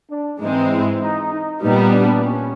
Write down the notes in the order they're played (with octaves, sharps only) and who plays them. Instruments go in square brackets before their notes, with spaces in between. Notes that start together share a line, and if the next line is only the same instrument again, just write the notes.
[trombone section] D4
[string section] G#2 E3 G#3 C4 [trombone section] D#4
[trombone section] E4
D#4
D#4
[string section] A#2 G3 B3 [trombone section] D#4
[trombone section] D4
C#4